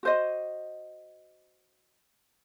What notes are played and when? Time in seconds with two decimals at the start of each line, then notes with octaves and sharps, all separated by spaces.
0.03 F#4 C5 D#5